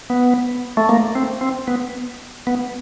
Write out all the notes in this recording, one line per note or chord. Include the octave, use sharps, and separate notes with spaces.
B3
A3
A#3
C4
C4
B3
B3